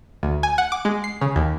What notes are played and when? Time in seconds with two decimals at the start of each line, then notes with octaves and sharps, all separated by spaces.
0.23 D2
0.43 G#5
0.58 F#5
0.72 D6
0.85 G#3
1.04 C7
1.21 C#3
1.36 D#2